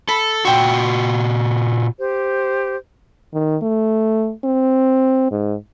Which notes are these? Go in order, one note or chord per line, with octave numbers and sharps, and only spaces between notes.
A4 B5
A#2 F#4 G5 C6 E6
G4 C5
D#3
A3
C4
G#2